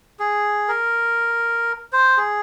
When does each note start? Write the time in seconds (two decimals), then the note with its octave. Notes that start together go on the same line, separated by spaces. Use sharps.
0.19 G#4
0.68 A#4
1.93 C5
2.17 G#4